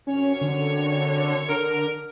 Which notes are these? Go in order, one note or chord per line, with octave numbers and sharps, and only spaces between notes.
F#2 C3 C#4 C#5
D3
D3 A#4